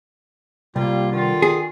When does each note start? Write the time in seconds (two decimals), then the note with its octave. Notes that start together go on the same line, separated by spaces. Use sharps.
0.76 C2 G3 A#3 F4
1.12 D3 D#3 F4
1.42 G#4